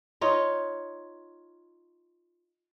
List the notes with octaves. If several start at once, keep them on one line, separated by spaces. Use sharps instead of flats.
D#4 F4 C#5